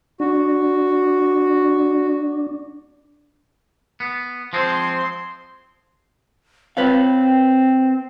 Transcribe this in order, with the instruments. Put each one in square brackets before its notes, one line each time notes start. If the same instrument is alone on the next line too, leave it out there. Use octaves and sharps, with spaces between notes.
[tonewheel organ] D4 [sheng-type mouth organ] F#4
[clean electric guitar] B3
[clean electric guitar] F3 G#3 C4 [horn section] C6
[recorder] C4 [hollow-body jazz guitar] B4 C#5 F5